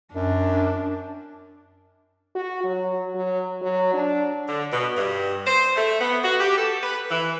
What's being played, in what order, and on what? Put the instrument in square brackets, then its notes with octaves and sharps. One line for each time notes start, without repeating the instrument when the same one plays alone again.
[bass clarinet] F#2 [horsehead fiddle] D4
[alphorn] F#4
F#3
F#3
F#3
D4
[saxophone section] D3
B2
G2
C5
A3
B3
F#4
G4
A4
B4
E3